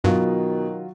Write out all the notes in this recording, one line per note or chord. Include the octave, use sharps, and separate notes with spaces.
G2 B2 D#3 F#3 F4 F#4